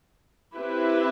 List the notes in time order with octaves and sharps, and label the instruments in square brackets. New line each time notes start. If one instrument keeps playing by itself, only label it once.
[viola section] C4 E4 G4 B4